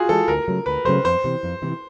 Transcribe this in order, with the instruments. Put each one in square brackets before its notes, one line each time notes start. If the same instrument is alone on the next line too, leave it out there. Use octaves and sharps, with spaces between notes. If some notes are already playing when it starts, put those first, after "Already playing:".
Already playing: [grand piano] F4 F#4 G#4
[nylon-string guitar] E3 G#3 [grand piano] A4
[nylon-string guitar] D2 [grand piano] A#4
[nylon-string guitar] C#3 F#3 A3
[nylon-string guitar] D2 [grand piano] B4
[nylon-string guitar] C#3 F#3 A3 [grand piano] C5
[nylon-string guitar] F2 [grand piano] C5
[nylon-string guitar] C3 E3
F2
C3 E3